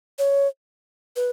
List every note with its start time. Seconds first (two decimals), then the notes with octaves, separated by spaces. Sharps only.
0.19 C#5
1.16 B4